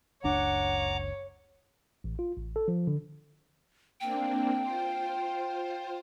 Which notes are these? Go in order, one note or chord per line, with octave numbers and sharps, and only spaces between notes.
F#1 C#2 D4 C#5 F#5 A#5 D6
A1
F4
A1
A4
F3
D3
A#3 C4 D4 G5
F4 C5